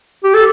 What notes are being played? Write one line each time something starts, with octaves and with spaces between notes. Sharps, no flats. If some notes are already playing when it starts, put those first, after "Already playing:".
G4
A4